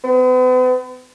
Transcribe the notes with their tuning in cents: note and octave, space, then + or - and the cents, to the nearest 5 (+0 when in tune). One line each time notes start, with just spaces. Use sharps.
B3 +45